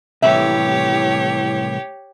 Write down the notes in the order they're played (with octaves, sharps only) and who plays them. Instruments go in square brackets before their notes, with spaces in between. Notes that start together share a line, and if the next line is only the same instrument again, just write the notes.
[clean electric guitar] C2 A2 E3 [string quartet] G4 C#5 [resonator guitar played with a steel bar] E5